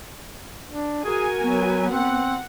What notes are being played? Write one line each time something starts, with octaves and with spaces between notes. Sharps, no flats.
D4
F#4 G#4 A#4 G#5
F#3 B3
C4 F#5